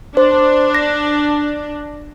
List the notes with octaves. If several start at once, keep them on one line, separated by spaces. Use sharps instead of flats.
D4 C5
A#6